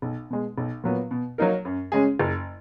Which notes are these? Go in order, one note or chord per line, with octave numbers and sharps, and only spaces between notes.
B1
B2 G#3
B1
A#2 F#3 B3
B2
F#3 A#3 D#4 A#4
F#2
C#3 G#3 C#4 G#4
F#1